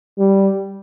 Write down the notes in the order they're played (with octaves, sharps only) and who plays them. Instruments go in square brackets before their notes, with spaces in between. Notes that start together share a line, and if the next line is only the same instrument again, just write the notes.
[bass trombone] G3